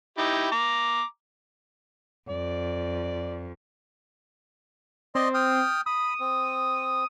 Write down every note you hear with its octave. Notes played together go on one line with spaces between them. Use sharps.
D#4 E4 G4
A#5 D6
F2 D5
C4 D5 D#5 C6
G5 D#6 F6
B5 D#6
C4